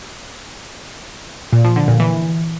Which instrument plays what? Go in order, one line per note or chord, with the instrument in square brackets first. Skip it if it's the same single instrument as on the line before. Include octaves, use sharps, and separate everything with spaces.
[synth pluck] A#2
F3
D3
A#2
E3